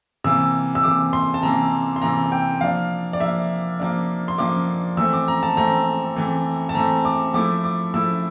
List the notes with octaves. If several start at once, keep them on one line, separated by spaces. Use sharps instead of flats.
C3 E3 A#3 E6
E6
C3 E3 A#3 D6
C6
A5
C3 E3 A#3 A#5
C6
C3 E3 A#3 A#5
G5
F3 A#3 D4 F5
D5
F3 A#3 D4 E5
F3 A#3 D4
C6
F3 A#3 D4 D6
E3 A3 C4 E6
D6
A#5
A5
E3 A3 C4 A#5
E3 A3 C4
A5
E3 A3 C4 A#5
D6
F3 A3 E4 D6
D6
F3 A3 E4 E6